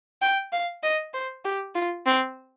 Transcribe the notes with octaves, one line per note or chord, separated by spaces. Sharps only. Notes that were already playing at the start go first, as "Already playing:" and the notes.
G5
F5
D#5
C5
G4
F4
C4